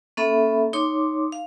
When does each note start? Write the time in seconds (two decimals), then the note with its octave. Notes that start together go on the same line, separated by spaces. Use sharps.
0.17 A#3 C#4 A4 E5 B5
0.73 D#4 C#5 C6 D6
1.32 F5